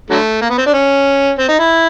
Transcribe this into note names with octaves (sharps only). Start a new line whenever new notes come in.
D3 F#3 A3
A#3
B3
C4
D4
C#4
C4
D#4
E4